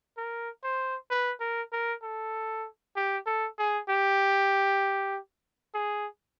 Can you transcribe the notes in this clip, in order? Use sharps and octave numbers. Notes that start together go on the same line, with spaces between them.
A#4
C5
B4
A#4
A#4
A4
G4
A4
G#4
G4
G#4